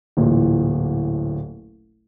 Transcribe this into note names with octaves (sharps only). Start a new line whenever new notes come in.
D1 A1 A#2